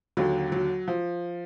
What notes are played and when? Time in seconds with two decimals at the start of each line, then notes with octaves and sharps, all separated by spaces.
0.17 D#2 D3 F#3
0.52 F#3
0.88 F3